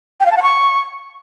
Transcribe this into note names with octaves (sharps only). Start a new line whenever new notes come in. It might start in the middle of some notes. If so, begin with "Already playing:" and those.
G5
F5
A5
F#5
C#6